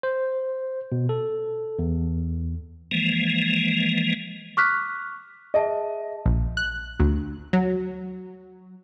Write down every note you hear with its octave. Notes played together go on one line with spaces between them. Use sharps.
C5
B2
A4
E2
E3 F3 G#3 A#3
C#6 D6 F6 F#6 B6
G#4 D#5 E5 A5
A#1
F#6
D2
F#3